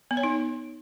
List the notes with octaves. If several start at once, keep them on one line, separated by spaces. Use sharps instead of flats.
B3
C#5
D#4